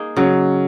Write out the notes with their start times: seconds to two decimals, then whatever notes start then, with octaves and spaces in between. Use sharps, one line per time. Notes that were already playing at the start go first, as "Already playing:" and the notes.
Already playing: A#3 D#4 G#4
0.17 C#3 F#3